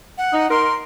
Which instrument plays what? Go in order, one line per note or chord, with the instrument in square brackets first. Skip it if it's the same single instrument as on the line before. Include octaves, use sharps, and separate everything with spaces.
[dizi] F#5
[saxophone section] D#4
[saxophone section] D#4 A#4 [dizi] C6